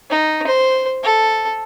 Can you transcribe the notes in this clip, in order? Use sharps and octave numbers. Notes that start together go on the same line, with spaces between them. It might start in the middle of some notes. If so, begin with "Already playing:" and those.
D#4
C5
A4